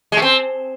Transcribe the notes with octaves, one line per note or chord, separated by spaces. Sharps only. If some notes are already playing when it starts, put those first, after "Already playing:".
G#3
A3
C4